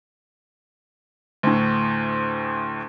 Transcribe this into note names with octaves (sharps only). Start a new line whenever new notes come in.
D2 A2